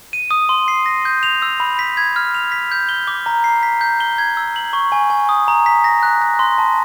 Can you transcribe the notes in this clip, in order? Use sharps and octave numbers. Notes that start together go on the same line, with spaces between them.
D#7
D#6
C6
C7
A#6
G6
F7
E6
B5
B6
G#6
F6
F7
B6
G6
G7
D6
A#5
C7
B6
G6
G7
G#6
E6
F#7
C#6
G#5
G#5
D#6
A#5
B6
A#6
F#6
F#6
C6
A5